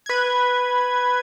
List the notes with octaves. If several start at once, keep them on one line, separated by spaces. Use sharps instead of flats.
B4 G#6